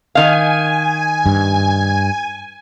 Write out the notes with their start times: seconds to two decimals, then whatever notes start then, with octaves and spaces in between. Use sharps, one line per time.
0.15 D#3 F5 G#5
1.26 G2